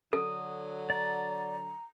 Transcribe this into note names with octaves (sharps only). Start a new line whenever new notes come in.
D3 F#3 A4 D#6
D5 A#5